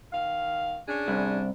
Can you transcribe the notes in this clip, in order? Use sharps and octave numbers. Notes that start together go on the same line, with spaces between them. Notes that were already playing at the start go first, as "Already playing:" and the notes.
D#3 F5
C#4 D4 G#4
C2